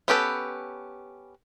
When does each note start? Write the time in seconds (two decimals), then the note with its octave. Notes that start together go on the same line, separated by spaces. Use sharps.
0.08 B3 C#4 G4 A4 B4